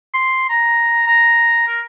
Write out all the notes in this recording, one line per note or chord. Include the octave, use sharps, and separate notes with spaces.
C6
A#5
A#5
A#4